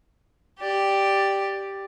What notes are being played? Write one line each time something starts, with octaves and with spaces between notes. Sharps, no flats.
G4 D5